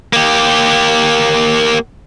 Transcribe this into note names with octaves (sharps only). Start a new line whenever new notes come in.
A#3 G4